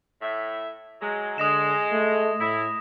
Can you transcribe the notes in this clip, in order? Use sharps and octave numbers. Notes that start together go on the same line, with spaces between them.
A2 E5
F#3 G#3
D3 G#3 D#6 A#6 E7
A3
A2 E4